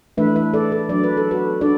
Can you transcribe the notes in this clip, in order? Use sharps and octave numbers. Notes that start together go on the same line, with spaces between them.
E3 A3 D4 B4 E5
B4 E5
A4 D5
A4
F#3 D4 D5
B4
A4
F#4 B4
D4 A4 D5